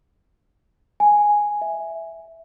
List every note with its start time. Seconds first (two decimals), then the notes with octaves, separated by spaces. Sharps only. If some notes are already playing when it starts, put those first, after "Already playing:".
1.00 G#5
1.62 E5